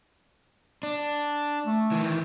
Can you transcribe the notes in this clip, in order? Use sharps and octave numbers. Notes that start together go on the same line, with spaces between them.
D4
A3
D#3 E3